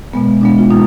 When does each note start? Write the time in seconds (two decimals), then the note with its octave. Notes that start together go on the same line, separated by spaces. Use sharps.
0.13 B2 G#3 B3
0.41 B2 G#3 B3 D4
0.58 F4
0.70 B2 A#3 D#4